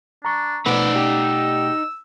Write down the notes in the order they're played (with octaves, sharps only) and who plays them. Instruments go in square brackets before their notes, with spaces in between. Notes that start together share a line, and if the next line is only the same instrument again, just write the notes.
[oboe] D4 [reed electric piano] A#5 C#6
[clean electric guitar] F2 B4 [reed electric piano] B2 A3 F#5 [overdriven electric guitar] D#4 D5 [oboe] E6
[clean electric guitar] G4